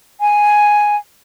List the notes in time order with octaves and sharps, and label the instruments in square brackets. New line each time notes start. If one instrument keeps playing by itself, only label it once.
[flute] G#5